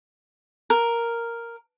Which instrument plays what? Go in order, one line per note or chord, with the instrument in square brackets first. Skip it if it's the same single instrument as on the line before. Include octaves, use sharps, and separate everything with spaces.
[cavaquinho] A#4